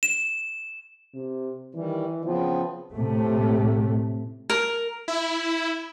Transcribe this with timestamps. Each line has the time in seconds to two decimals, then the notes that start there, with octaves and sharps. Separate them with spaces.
0.03 E7
1.15 C3
1.75 D#3 E3 G3
2.25 C#3 F3 B3 C4
2.92 A2 C3 A3
4.50 A#4
5.08 E4